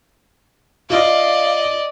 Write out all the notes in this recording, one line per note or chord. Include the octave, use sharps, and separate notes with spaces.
F4 D5 D#5 F5